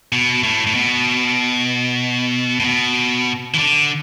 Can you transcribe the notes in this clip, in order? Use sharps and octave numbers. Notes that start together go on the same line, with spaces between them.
B2
A2
A2
B2
A2
B2
E3
D3